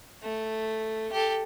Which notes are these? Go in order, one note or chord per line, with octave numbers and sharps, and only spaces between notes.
A3
G4 A4